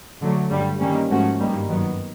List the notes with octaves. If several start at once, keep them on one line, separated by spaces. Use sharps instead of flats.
D3 F#3 A3
G2 D3 G3
D#3 G3 A#3 C#4
G#2 F3 A3 C#4 F#4
G2 D#3 G3 A#3
F#2 D#3 F#3 B3